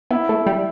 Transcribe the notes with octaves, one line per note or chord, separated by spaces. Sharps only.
B3 E4
A3
G3